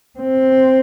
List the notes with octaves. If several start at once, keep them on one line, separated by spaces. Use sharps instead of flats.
C4